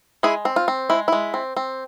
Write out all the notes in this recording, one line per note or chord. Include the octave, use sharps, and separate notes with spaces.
G#3 E4 G#4
C4
F4
C4
G#3 E4
G#3 E4
C4
C4